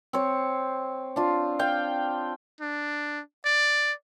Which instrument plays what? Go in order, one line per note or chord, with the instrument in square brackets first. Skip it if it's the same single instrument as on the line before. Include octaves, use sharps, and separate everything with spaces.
[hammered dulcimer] C4 C#5
D4 F4
F5 G5
[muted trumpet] D4
D5